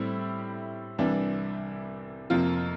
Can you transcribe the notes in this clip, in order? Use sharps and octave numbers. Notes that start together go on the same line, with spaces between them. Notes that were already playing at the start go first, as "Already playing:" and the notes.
Already playing: A2 G3 C4 E4 G4
C2 C3 E3 G3 D4
F2 C3 F3 A#3 F4